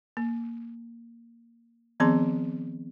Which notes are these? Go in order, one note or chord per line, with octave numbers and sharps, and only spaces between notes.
A#3
D#3 F3 B3 C4 G#4 C6